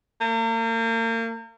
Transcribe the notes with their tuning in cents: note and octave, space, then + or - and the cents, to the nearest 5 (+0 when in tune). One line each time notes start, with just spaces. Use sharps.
A#3 -40